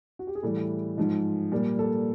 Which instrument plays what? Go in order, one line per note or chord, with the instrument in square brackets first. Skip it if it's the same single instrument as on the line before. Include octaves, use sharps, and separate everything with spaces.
[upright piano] F#4
G4
G#4
A2 E3 G3 A4
G#2 F3 G#3
A#2 G3
A4